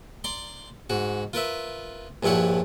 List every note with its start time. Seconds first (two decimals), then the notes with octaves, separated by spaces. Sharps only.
0.24 D5 A#5 C6
0.90 G#2 F#4
1.33 F4 A#4 B4 E5
2.23 A#1 G2 F3 E4 C#5 F#5